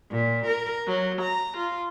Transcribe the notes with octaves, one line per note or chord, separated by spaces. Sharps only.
A#2
A#4
F#3
A#5
F4